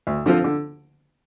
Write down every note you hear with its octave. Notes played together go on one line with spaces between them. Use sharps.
D2
D3 F3 C4 F4
D3